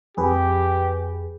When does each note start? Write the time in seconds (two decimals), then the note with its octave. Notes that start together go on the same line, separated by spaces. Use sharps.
0.17 F2 G4 G#4 B4